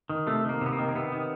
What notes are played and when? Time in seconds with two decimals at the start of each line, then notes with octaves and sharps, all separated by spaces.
0.09 D#3
0.27 C3 A3
0.45 D#3 A#3
0.61 C3 B3
0.73 A#3
0.79 D#3
0.88 A#3
0.95 C3 B3
1.12 D#3